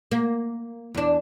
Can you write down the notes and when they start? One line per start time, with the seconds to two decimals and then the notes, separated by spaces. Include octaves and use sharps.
0.11 A#3
0.94 E2 D4